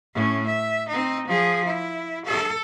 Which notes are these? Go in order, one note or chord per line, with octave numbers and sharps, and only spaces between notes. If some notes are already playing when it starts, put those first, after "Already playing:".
A2 C#4
E5
C4 D#4
F3 G#4
E4
A4